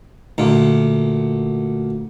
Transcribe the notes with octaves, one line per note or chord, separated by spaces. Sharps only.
D2 A#2